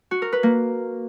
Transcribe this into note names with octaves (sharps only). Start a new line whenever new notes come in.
F#4
A#4
B4
A#3